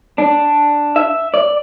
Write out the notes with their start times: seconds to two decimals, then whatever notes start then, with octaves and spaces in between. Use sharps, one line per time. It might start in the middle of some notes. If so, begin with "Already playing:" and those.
0.18 D4
0.96 E5
1.34 D5